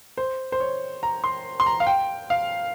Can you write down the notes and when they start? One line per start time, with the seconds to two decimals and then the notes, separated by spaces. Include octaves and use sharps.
0.17 C5
0.52 C5
0.60 C#5
1.03 A#5
1.24 C6
1.60 C6
1.66 A#5
1.80 F5
1.87 G5
2.30 F5